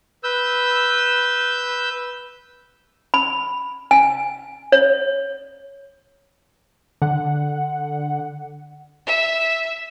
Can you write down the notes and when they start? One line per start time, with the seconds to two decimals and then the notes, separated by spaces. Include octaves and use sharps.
0.24 B4 E6 G6
3.14 B5
3.91 G#5
4.72 C#5
7.02 D3 F#5
9.07 E5